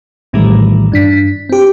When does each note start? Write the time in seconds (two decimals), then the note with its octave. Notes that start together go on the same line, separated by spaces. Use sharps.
0.33 A#1 A2 D#3 E3 G3 A3
0.92 G2 D4 B6
1.49 C4 G4